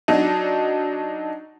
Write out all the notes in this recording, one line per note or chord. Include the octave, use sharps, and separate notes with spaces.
F#3 D4 D#4